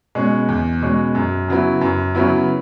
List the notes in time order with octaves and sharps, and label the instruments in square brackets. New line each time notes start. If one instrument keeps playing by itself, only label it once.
[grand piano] B2 G#3 C#4
E2
B2 G#3 C#4
F#2
C#3 F#3 B3 E4
F#2
C#3 F#3 B3 E4